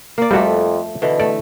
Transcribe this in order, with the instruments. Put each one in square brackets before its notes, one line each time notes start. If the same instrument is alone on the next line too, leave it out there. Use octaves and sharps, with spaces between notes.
[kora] A#3 D5
[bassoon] F2 [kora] F3 A3 [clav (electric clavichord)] G3 F#4
[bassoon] B2 [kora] D3 E3
[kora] A3 [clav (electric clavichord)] D5